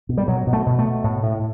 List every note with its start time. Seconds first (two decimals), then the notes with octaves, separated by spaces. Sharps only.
0.09 B2
0.18 G3
0.28 B2 F#3
0.47 B2
0.53 A3
0.66 B2
0.79 A3
0.85 B2
1.04 A2
1.23 A2